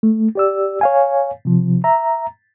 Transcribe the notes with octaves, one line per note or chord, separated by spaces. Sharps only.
A3
G4 D5 E6
C#5 F5 G#5
C3 F3
E5 A#5